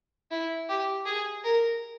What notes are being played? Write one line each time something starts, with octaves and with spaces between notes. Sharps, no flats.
E4
G4
G#4
A#4